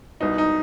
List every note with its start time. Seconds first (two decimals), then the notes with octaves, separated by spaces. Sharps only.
0.20 C2 B2 D#4
0.38 D#4